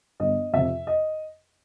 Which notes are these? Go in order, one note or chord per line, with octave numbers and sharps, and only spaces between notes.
G1 D#5
F2 C3 F3 E5
D#5